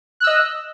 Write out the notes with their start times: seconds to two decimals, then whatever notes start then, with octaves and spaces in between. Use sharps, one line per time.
0.20 F#6
0.24 E6
0.27 D#5